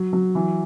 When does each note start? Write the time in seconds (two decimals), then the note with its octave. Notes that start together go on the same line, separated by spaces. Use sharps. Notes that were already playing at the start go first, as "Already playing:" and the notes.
Already playing: F#3
0.13 F#3
0.35 E3